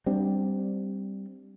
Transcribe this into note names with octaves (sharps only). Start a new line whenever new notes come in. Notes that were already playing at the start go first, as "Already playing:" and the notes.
G3 C4 D4